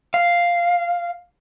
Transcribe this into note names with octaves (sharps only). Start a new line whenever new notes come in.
F5